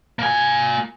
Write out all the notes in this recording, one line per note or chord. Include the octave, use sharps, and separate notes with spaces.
A#3 G#5